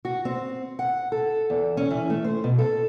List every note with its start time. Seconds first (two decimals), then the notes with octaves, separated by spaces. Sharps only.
0.05 F#4
0.25 C4
0.79 F#5
1.12 A4
1.50 E2
1.77 C#4
1.91 E3
2.10 A3
2.24 C5
2.44 B2
2.58 A4